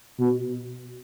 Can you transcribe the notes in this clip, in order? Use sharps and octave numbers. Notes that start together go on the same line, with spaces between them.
B2